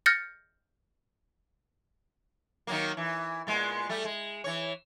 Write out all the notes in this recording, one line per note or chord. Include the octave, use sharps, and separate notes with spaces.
F6 G6 A6 A#6 C#7
D#3 F#3 A#3
E3
A#2 G#3 B3
G3 A3
G#3
E3 C#5